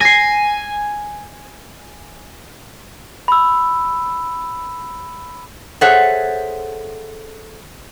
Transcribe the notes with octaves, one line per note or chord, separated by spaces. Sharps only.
G#5 A#6 C7
B5 E6
G#4 A4 C5 C#5 E5 F#5